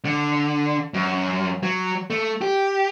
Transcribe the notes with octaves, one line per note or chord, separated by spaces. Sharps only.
D3
F#2
F#3
A3
G4